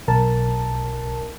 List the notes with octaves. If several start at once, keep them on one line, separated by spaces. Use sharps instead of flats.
B1 A#4 A5